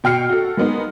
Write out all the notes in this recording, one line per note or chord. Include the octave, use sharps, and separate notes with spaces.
B2 G5 F6 C7 C#7
F#4 A4
G#3 A#3 B3 D#4